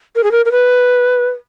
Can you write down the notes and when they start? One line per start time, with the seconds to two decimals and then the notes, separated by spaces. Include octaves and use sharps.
0.16 A#4
0.23 G#4
0.32 A#4
0.45 A#4
0.52 B4